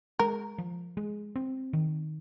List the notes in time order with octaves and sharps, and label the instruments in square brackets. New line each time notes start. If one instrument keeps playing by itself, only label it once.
[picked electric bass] G#3 [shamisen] A#4
[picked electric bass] F3
G#3
C4
D#3